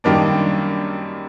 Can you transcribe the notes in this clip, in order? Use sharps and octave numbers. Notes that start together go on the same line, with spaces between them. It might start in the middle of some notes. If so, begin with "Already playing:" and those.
F#2 D#3 G3 A#3 D4